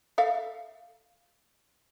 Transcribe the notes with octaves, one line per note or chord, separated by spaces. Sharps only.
A4 E5 F5